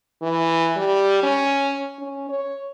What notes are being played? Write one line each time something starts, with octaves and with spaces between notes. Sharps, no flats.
E3
G3
C#4
C#4
C#5